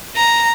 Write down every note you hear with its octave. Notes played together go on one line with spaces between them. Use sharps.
A#5